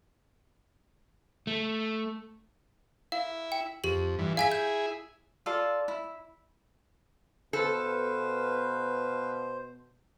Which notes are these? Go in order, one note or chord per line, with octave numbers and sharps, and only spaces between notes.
A3
E4 F5
G5
F2 G4 F#7
G2 E3
E4 G#4 F5 G#5 B6
G6
F4 A4 D5
E4
B2 A4 B4 C5 F5